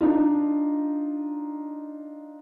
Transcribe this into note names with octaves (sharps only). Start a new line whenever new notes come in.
D4 D#4 F4